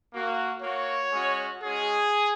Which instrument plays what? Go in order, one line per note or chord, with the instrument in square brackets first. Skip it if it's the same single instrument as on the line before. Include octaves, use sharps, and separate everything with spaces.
[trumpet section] A#3 F#4
A#3 F#4 C#5
G#3 C#4 F#4
G#3 C#4 F#4 G#4